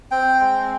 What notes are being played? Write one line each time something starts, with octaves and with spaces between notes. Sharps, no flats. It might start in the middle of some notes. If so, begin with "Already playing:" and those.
C4 G5
G#3